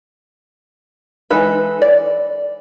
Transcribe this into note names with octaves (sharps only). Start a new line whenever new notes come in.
E3 G#3 D#4 A4 B4
D5